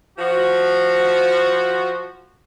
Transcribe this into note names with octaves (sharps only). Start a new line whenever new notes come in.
F3 F#4